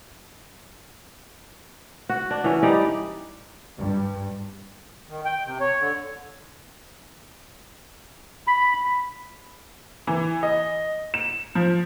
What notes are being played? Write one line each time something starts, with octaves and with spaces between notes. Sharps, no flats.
F#4
D4
E3 C#4
G3 D#4 D5
G2
D#3
G5
C3
C#5
D3
B5
E3
D#5
E7
F3